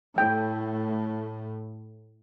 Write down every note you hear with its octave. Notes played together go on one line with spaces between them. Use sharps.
A2 G5